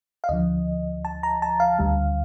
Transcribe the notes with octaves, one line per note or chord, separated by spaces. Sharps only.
F5
D2 D3 F3 D#5
A5
A#5
A5
F5
D2 D3 G3